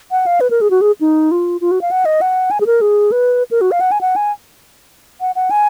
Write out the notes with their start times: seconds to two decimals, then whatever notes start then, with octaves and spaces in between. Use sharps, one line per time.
0.11 F#5
0.26 F5
0.41 B4
0.50 A#4
0.61 G#4
0.71 F#4
0.81 G#4
1.01 D#4
1.31 F4
1.61 F4
1.71 F#4
1.81 F5
1.91 F#5
2.05 D#5
2.21 F#5
2.51 G#5
2.61 G#4
2.66 A#4
2.81 G#4
3.12 B4
3.51 A#4
3.61 F#4
3.71 F5
3.81 F#5
3.92 G#5
4.01 F#5
4.16 G#5
5.21 F#5
5.36 F#5
5.51 G#5